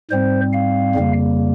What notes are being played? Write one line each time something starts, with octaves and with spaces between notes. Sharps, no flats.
G#2 G3 C4 C5
F5
F2 C#3 G3 A#3